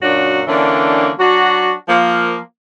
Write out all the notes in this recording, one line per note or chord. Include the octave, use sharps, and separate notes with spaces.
F#2 A#2 F#3 D4 F#4
D3 E3 A#3 C#4 D4
F#3 D4 F#4
F3 A#3